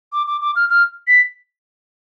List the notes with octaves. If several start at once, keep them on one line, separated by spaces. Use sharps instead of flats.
D6
D6
D6
F6
F6
B6